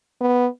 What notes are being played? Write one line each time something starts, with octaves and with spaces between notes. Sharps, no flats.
B3